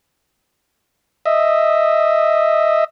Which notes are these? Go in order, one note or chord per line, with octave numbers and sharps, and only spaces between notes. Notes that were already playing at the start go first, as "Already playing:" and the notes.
D#5 E5